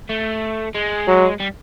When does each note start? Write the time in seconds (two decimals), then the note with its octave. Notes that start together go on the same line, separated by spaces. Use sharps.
0.09 A3
0.75 G#3
1.07 F#3
1.40 G3